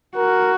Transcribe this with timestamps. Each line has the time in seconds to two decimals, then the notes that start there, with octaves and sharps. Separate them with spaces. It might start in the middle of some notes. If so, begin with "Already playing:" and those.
0.16 F#4 A#4